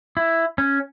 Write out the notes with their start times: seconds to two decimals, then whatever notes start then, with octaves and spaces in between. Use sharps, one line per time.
0.17 E4
0.58 C#4